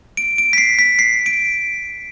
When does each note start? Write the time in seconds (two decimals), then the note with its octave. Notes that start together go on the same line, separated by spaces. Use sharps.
0.17 D7
0.38 D7
0.53 B6
0.58 C7
0.79 B6
0.99 C7
1.26 D7